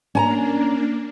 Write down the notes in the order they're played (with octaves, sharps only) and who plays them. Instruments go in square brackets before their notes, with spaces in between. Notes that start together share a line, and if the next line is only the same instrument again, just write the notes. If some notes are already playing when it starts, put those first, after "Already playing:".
[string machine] A#3 D4 [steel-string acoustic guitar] C#4 G#5 A#5